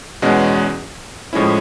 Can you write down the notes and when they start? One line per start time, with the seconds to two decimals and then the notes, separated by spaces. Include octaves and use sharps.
0.22 E2 B2 G#3 C#4 F#4
1.33 A2 F3 G#3 C#4 E4